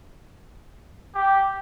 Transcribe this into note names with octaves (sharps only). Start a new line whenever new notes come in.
G4